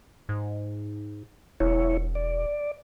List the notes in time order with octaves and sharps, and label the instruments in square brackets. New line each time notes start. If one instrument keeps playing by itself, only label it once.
[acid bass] G#2
[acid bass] E1 [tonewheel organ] E4 C#5
[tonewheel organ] D5